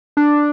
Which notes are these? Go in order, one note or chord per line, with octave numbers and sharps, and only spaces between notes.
D4